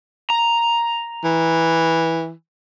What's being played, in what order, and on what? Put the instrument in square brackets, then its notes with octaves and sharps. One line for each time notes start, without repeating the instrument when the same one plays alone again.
[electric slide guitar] A#5
[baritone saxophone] E3